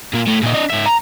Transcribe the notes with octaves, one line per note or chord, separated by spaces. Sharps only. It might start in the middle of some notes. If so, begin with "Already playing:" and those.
A#2 A#3
A2 A3
A#2 D#4
D4 D#5
G#2 E5
A#5